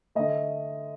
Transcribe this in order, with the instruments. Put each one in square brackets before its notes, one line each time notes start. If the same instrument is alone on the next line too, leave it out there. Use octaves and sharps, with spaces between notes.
[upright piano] D3 A3 D#5